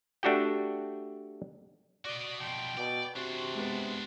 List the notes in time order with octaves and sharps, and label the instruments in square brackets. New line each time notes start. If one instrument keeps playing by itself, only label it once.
[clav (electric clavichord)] A3 D4 F#4 G4 G5
[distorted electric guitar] F#4 D#5 [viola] D5
[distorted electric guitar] B2 F3 [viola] G5
[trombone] B2 [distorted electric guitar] D5
[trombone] C3 [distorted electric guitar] D4 C5 [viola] F#4
[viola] G#3 B3